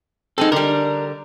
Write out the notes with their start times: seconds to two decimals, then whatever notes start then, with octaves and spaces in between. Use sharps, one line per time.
0.38 G#3 C4 D#4 G#4 A4
0.52 D3 G3 A#4